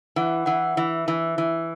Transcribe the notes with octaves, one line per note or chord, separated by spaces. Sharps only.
E3 F#5
E3 F#5
E3 E5
E3
E3